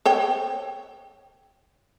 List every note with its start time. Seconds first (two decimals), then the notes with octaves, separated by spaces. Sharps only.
0.06 C5 C#5 G5